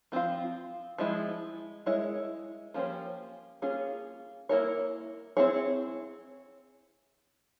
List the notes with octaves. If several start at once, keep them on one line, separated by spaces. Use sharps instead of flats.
F3 C4 F4
F3 G#3 E4
G#3 E4 A#4 C#5
F3 A#3 C#4 G4 C5
A#3 C#4 F4 G#4
A#3 E4 A#4 C#5
C4 E4 G#4 C#5